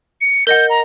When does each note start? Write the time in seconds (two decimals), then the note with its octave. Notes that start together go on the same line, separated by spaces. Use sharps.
0.21 C#7
0.47 A#4 D#5 F#5 G6
0.70 A#5